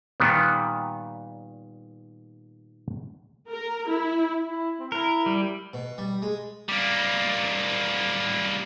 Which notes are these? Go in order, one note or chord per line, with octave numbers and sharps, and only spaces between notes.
A#2 D#3 G3 B3
A#4
E4
E4
C4
E4 A#4
G3
B2
G3
G#3
G3 A#3